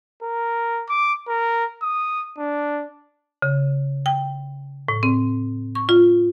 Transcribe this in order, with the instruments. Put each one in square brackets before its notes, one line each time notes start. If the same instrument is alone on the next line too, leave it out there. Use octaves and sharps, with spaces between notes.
[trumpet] A#4
D6
A#4
D#6
D4
[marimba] C#3
G5
A2
C4
C#6
F4